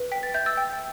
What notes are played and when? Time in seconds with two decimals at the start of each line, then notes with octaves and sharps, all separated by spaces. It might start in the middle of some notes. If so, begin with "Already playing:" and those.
Already playing: B4
0.12 G5 B6
0.23 A6
0.34 E5 G6
0.46 E6 A6
0.57 G5